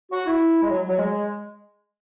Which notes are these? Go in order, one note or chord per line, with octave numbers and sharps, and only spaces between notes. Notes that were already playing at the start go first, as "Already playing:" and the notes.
F#4
E4
G#3
F#3
F#3
G#3